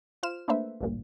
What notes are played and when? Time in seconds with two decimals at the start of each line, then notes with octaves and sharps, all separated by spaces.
0.23 F4 C5 F6 E7
0.48 A3 A#3 D4 B4 C5 E5
0.81 A1 D2 G2 A#2